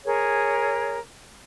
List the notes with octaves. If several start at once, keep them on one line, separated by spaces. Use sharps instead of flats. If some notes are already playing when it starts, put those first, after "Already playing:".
G#4 A#4 C#5